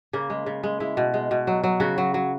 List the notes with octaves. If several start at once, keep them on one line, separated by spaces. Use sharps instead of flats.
C#3 A#3
G#3
C#3
G#3
G#3 E4
B2
G#3
B2
F#3
F#3
C#3 F#4
F#3
F#3